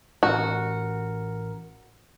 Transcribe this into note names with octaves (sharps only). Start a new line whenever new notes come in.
A1 F#4 A#4